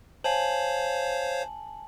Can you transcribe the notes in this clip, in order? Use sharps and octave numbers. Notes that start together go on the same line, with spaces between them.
C5 C#5 F5 G#5 A5 F#7